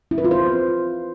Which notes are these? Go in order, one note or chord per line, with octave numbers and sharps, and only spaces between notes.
E4
B4
F4
C5